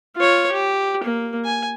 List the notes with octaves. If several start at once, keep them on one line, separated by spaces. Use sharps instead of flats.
F4 C#5
G4
A#3
G#5